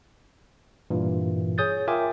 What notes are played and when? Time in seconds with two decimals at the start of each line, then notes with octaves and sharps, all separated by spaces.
0.90 G2 A#2 E3
1.58 G#4 C#5 D#6 G6 A6
1.88 F4 A#4 E5 G5 G#5 D6